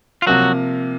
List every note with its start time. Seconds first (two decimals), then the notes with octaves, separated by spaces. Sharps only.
0.22 F4
0.27 C3 F3 F#3 A#3 F#4